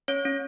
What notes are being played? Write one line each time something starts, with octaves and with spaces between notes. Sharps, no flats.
C#4 C#5
C#4